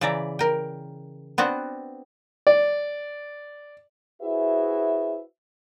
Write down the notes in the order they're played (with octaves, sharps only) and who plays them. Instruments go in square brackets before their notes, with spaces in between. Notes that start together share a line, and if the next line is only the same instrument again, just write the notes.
[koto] C#3 E3 D5 E5 A#5
A#4 G5
B3 C4 D4 F#4
[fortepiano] D5
[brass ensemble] E4 F#4 G#4 B4 C5 E5